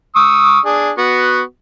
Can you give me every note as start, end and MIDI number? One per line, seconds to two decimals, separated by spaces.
0.16 0.59 85
0.16 0.59 87
0.16 0.59 88
0.65 0.91 62
0.65 0.91 68
0.98 1.41 59
0.98 1.41 66